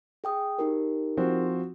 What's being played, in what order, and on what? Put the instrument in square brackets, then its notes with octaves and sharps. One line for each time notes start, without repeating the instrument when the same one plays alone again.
[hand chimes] G#4 G5 D#6
D#4 G4 A#4
[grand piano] F3 C4 F#4